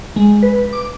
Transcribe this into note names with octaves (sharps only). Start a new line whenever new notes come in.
G#3
B4
D6